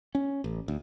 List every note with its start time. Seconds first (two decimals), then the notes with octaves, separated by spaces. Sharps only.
0.15 C#4
0.44 A1
0.68 D2